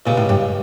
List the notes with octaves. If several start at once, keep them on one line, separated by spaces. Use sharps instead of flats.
C#2 A#2 C#3 G3
A2
G2